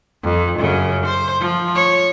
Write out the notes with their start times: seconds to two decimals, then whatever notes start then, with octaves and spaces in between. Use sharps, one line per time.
0.24 F2
0.59 F#2 C#3
1.06 C5
1.40 F3
1.75 C#5